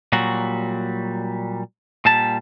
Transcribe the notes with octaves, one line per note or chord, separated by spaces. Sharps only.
A#2 F#3 G3 F#4
A#2 G3 A5